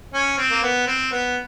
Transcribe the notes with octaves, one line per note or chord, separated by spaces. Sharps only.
C#4
C4
A#3
B3
C4
B3